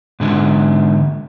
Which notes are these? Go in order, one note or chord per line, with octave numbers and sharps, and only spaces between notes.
G#2 D3 G#3